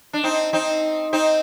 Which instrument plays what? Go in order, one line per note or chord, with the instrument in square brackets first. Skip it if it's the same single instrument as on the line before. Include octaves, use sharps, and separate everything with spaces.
[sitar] D4
C4 D#4
C4 D#4
C4 D#4